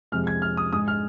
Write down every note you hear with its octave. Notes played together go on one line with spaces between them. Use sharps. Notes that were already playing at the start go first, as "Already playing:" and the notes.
F2 C3 G#3 F6
G#6
F6
D#6
G#2 G#3 D#6
F6